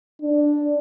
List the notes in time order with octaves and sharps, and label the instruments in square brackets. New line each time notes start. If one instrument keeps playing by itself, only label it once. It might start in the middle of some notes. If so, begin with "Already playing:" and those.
[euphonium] D4